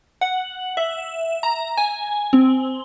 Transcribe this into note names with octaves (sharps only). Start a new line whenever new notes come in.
F#5
E5
A#5
G#5
C4